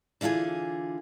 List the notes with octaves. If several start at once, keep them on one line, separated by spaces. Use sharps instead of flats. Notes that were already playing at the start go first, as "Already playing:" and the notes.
D3 E3 F4 G#4 G#5